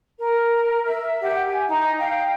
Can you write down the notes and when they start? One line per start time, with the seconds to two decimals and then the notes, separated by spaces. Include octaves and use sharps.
0.19 A#4
0.86 E5
1.21 G4 F#5
1.46 G#5
1.67 D#4
1.98 F5 G5